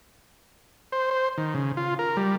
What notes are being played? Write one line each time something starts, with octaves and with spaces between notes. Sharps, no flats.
C5
C5
D#3
C#3
F4
A#4
G3